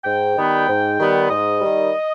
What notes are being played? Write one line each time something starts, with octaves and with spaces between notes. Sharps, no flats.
G#2 G5
D#3 G3 B3
G#2
D#3 G3 B3
G#2 D#5
D#3 G3